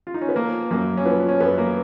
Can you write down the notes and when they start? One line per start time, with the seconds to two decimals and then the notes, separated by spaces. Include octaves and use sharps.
0.07 F4
0.14 D#4
0.22 C#4
0.29 B3
0.36 F3 A#3
0.71 F#2 A#3
0.97 C#4
1.06 F3 B3
1.29 C#4
1.41 F#2 B3
1.58 A#3